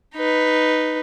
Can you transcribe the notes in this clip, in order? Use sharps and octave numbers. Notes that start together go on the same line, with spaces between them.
D#4 B4